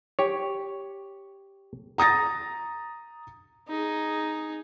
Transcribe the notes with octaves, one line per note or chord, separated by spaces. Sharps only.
G4 C#5
A#5 D#6 A6 A#6
D#4 G#4